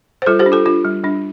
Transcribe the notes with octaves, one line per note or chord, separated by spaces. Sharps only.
C5
G3 F4 A4
G4 C5
D4
F4 A4
D4 F4
G3
G3 D4